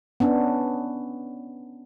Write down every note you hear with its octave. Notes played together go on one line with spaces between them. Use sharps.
B3 C#4 D4